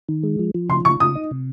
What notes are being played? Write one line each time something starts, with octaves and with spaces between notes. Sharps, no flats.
D#3
G#3
F3
F3
C#3 C6
C#3 C#6
C#3 D#6
D#4
C3